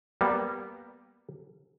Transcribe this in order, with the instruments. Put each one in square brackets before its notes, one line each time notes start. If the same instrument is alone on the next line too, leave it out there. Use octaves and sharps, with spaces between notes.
[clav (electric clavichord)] G3 A#3 B3